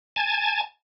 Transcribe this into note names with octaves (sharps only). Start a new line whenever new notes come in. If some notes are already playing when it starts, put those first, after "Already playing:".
G#5 A5